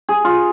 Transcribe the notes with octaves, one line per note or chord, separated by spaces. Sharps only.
G#4
F4